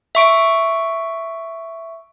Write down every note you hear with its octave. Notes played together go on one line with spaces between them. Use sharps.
E5 C#6 D7